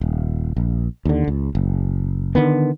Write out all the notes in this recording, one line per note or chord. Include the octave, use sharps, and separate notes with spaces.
D#1
A#1
D#2 D3
C#2
F#1
D3 D#3 B3